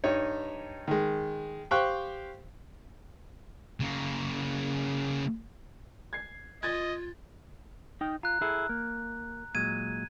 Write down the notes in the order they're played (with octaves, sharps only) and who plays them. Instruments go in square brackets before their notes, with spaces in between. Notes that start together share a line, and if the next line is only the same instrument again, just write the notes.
[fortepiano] G2 D#4 C#5
D#3 G#3
G4 C5 F5 G5 C#6 F#6
[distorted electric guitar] C#3 A#3
[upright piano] G#6 C7
[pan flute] F4 [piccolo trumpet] D#5 [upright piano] G#6 A6
[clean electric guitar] D#4 G5
[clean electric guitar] F4 [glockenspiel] A#5 F#6
[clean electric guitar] E4 G#4 A4
A#3
[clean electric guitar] A#2 F#3 G#3 [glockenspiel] G#6 D#7